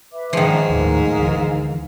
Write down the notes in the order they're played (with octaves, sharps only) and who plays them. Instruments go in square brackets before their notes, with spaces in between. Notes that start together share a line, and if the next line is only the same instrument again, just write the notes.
[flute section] B4 E5 D6
[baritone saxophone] G#2 [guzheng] D#3 F3
[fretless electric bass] D#2 A2 [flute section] D#4 A#4 F5
[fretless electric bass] D2 E3